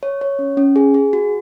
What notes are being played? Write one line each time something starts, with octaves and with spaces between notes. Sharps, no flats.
C#5
C#5
C#4
C#4
G#4
G#4
F#4